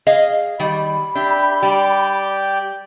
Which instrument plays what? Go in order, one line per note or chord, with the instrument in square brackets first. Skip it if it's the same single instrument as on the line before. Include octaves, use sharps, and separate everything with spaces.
[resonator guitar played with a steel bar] G#4 D#5 F5
[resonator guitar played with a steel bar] D#3 G3 [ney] B5
[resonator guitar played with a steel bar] D4 [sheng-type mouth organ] G4 E5 G6
[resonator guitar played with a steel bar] G3 [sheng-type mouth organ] G4 D5 G5